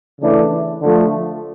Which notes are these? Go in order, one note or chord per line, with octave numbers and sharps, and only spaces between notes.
C#3 E3 A3 D4
D3 F3 A3